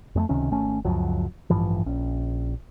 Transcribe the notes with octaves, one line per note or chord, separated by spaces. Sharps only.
F2 G#3 A3
C#2 C3 D#3 C#4
G#1 A3 C#4
C#2 F#2 F3 F#3
A1 G2 E3 F3
A#1 C#4